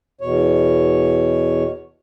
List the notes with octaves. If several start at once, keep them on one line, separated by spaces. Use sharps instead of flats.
E2 B2 C#5